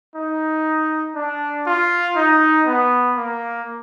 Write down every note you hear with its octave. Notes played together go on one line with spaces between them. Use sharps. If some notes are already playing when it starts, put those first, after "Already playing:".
D#4
D4
F4
D#4
B3
A#3